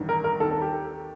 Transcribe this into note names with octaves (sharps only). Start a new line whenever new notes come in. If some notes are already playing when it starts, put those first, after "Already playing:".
Already playing: A1 G2 D#3
A#4
A#4
D#2 D#3 A4
A4
G4